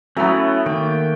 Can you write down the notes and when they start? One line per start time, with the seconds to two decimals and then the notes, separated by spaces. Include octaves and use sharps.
0.17 F#3 A3 B3 C#4 E4 A#5 E6
0.66 D#3 A#3 G5